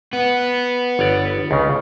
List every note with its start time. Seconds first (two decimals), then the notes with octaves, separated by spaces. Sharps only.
0.13 B3
0.99 G1 C#5 D5
1.51 C#2 C#3